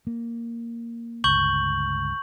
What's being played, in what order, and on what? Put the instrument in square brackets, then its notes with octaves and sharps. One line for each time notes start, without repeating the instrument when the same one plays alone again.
[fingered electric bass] A#3
[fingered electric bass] G1 C#2 [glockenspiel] C#6 G6 F#7